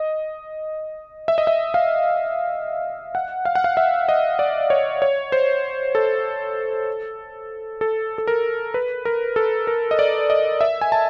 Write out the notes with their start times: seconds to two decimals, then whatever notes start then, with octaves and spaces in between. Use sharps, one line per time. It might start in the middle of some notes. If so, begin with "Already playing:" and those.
Already playing: D#5
1.28 E5
1.38 D#5
1.47 E5
1.74 F5
3.15 F#5
3.45 F5
3.55 F#5
3.64 F5
3.77 E5
4.09 D#5
4.39 D5
4.70 C#5
5.02 C#5
5.32 C5
5.95 A4
7.81 A4
8.18 A4
8.27 A#4
8.74 B4
9.05 A#4
9.36 A4
9.67 A#4
9.91 D#5
9.99 D5
10.30 D#5
10.61 E5
10.81 G#5
10.92 A5